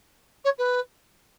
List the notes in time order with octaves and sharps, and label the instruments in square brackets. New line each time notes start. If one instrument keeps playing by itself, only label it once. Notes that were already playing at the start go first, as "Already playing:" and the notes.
[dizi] C#5
B4